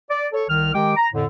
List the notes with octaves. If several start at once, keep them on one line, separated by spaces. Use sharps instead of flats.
D5
A4 C#5
C2 D#3 F6
D#3 G#3 G4 G5 D6
A#5
F2 A2 D3